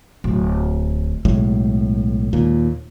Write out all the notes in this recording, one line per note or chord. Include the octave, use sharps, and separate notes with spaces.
D1
B1 A2 G#3
D#2 A#2